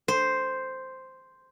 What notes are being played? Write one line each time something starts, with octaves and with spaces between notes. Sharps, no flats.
C5